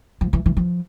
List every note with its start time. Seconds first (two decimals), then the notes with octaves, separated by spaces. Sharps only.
0.21 F3
0.33 E3
0.46 E3
0.57 F3